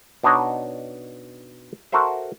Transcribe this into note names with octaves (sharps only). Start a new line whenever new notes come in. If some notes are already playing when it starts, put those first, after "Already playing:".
B2 D4 D#4 C#5 D#5
F#4 A4 A#4 C5 E5